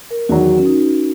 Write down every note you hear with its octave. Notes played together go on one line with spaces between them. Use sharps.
A#4
E2 D#3 F#3 F#4
C#4
D#4